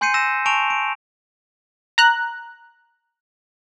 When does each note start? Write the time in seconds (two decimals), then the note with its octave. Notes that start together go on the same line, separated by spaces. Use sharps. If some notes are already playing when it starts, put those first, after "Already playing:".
0.01 G#5 C6 G6 C7 C#7 D#7
0.14 E6 A#6 E7
0.46 G#5 A5 C#6 D7 E7 F7
0.70 D7
1.98 A#5 F#6